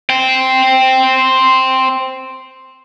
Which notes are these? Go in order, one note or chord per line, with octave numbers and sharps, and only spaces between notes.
C5 G5